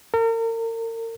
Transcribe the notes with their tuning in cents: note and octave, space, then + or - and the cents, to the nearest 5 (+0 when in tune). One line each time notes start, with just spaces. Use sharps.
A#4 -40